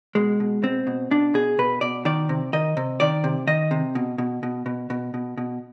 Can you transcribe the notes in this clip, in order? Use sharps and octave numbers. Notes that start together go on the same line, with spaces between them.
B2 G#3
B2
B2 C4
B2
B2 D4
B2 G#4
B2 B4
B2 D5
D#3 D5
C3
D#3 D#5
C3
D#3 D5
C3
D#3 D#5
C3
B2
B2
B2
B2
B2
B2
B2